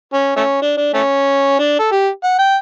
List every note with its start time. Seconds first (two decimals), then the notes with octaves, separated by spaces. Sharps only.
0.13 C#4
0.36 A3 C#4
0.62 D4
0.77 D4
0.94 A3 C#4
1.59 D4
1.79 A4
1.91 G4
2.24 F#5
2.39 G5